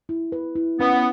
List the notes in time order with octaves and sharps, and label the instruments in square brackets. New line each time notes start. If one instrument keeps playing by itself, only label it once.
[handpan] E4
B4
E4
[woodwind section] B3 [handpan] C#4